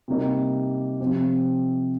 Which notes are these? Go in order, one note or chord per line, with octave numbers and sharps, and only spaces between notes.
C3 G3 A#3 D#4
C3 F3 C4 G4